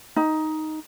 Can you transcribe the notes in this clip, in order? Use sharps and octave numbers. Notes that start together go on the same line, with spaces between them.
D#4